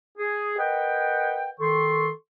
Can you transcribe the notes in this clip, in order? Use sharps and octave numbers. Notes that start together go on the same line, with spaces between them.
G#4
A#4 B4 D#5 F#5 G5
D#3 A4 C6 C#6